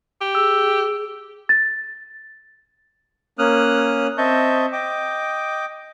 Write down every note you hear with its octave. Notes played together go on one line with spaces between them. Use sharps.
G4
G#4 E6
A6
A#3 C#4 D#6 F6 F#6
C4 D#5 E5 A5 C#6 G6
D#5 G5 D6